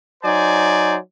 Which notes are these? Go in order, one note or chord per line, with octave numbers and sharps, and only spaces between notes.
F#3 D#4 C5 D5 G#5